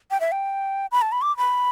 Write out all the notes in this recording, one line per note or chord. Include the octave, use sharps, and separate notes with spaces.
G5
E5
G5
B5
A5
B5
D6
B5